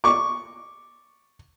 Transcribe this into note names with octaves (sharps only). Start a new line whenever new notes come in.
C#6 D6